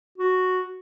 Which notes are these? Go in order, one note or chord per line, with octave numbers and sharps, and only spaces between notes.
F#4